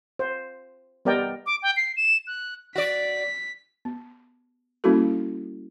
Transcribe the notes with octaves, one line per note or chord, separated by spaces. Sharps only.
C5
G3 B3 A#4 D5 D#5 G5
D6
G5
C7
E7
F#6
F#4 D5 B6
B3
G3 A#3 C#4 E4 F#4 A4